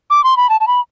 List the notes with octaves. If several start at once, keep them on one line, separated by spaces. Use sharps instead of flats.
D6
C6
B5
A5
A5
B5